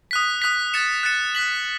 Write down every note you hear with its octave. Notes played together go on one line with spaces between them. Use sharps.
D#6 F#6 B6
D#6 F#6 B6
F#6 A6 C#7 E7
F#6 A6 C#7 E7
F#6 B6 F#7